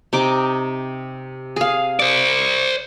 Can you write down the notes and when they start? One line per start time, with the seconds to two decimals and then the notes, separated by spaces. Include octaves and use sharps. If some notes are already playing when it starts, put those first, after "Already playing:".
0.13 C3 D#4 D6
1.56 G#4 F5
2.00 C5 D5